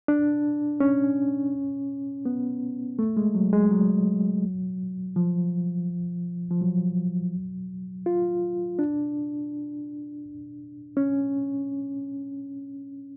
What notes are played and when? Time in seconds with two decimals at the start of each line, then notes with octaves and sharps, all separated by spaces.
0.08 D4
0.80 C#4
2.26 B3
2.99 A3
3.17 G#3
3.35 F#3
3.53 G#3
3.71 F#3
5.16 F3
6.51 F3
6.61 F#3
8.06 F4
8.79 D4
10.97 C#4